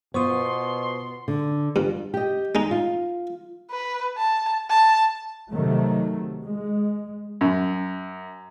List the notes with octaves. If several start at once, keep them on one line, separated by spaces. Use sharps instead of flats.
B2 B3 F4 C5 C6 C#6 D#6
D3
G2 F4
G4 D#5
G#3 D#4
F4
B4
A5
A5
C3 D#3 F#3 A3
G#3
F#2